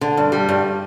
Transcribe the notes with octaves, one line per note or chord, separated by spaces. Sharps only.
D3
G2
G3
G2